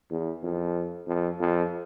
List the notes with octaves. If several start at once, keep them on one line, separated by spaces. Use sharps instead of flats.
E2
F2
F2
F2